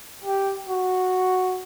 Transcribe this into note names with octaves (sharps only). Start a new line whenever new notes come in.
G4
F#4